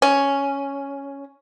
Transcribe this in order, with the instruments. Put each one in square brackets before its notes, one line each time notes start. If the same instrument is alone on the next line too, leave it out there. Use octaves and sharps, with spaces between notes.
[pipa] C#4